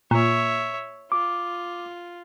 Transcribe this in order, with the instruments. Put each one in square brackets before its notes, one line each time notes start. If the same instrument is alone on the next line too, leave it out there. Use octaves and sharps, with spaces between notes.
[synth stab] A#2 [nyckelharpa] C#5 E5
[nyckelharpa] F4 [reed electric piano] D6